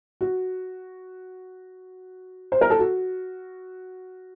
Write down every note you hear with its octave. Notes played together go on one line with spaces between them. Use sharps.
F#4
C5
A#4
A4
F#4